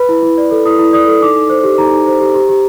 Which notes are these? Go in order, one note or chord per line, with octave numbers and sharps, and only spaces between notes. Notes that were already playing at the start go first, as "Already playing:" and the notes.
Already playing: B4 B5
E4
E4
D5
A4
E4 D#6
E4
D5 D#6
A4
D#4 D6
D#4
C5
G4
D#4 A#5
D#4
C5
G4
G4
G4